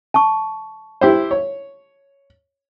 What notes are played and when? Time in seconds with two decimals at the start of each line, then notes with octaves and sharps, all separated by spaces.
0.14 A5 C#6
1.01 E4 G4 C5
1.31 C#5